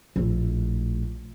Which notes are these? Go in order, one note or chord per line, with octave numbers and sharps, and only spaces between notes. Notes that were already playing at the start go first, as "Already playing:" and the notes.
A#1 A2